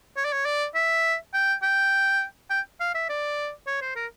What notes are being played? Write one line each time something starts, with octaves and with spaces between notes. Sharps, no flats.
C#5
D5
C#5
D5
E5
G5
G5
G5
F5
E5
D5
C#5
C5
A#4